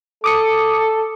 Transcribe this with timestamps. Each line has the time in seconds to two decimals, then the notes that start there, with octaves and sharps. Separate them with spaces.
0.24 A4 D6 D#6 C#7